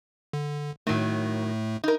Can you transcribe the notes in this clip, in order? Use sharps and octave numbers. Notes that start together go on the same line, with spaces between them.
D3
A2 D#3 F#3 A3
D#4 A#4